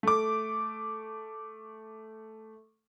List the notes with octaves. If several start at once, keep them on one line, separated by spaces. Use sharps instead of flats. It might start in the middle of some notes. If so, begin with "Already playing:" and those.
A3 D6